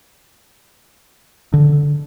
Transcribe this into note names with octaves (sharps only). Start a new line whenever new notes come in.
D3